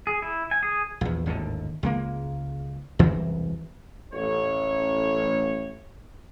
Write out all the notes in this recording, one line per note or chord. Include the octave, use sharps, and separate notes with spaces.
G#4
E4
G#5
G#4
A#1 E2
G#1 D#2 A2 D3
C#2 G#3 A#3
E1 C2 F#2 E3
A1 C#5